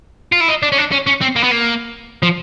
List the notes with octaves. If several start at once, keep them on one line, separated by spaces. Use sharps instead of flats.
F4
E4
D#4
D4
C#4
D4
C#4
C#4
C4
A#3
B3
A#3
F3